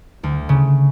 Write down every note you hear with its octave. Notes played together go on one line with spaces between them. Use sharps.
D2
C#3